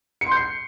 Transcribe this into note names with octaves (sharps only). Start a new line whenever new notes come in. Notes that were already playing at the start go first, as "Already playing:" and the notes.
C#7
C6
G6
C7